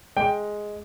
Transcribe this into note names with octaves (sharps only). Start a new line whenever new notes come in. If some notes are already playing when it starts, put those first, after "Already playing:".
G#3 G5